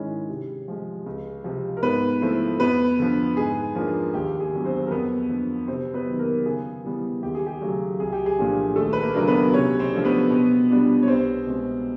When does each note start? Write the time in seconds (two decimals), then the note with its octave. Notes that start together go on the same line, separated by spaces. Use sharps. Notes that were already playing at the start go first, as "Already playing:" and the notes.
Already playing: G#2 D#3 G#3 C#4 E4
0.29 C3
0.68 F3 G#3
1.06 C#2
1.44 C3 F3
1.77 A#4
1.82 G#2 B3 B4
2.21 F3 A3 C4 E4
2.60 F2 B3 B4
2.99 D3 F3
3.37 G#2 G#4
3.75 F3 A#3 D4 F4
4.14 D#2 G4
4.40 G#4
4.53 D3 F#3 B3
4.65 C4 C5
4.87 A#4
4.91 F2 B3 B4
5.30 D3 F3 A#3
5.68 C3 C4 C5
5.94 B3 B4
6.06 D#3 F#3
6.19 A#3 A#4
6.46 C#3 G#4
6.84 E3 G3 B3
7.22 D#2 G4
7.35 G#4
7.47 G4
7.61 C#3 F#3 A3
7.99 C2 G#4
8.13 G4
8.26 G#4
8.39 A#2 F3 A3 D4
8.76 D#2 A3 A4
8.93 B4
9.02 A#3 A#4
9.14 C#3 F#3 A3 D4 A#4
9.27 B3 B4
9.53 C3 C#4 C#5
9.79 C4 C5
9.93 F3 A3 D4
10.05 B3 B4
10.30 B2
10.69 G3 B3 D4 F4
11.02 C#5
11.08 C2 C4 C5
11.46 B2 G#3 C4